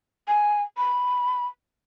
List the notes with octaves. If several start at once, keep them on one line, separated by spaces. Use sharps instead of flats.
G#5
B5